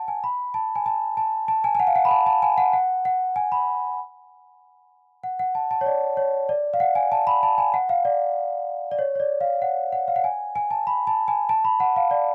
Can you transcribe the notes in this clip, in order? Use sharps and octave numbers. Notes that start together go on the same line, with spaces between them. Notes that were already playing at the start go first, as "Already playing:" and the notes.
Already playing: F#5 A5
G#5
B5
A5
G#5
A5
A5
A5
G#5
G#5
F#5
F5
F#5
B5
A5
A5
G#5
F#5
F#5
F#5
G#5
B5
F#5
F#5
A5
A5
C#5
D5
C#5
D5
F5
F#5
G#5
A5
B5
A5
G#5
F#5
F5
D5
D5
C#5
C#5
D5
F5
F#5
F#5
F5
F#5
G#5
G#5
A5
B5
A5
G#5
A5
B5
F#5
F5
D5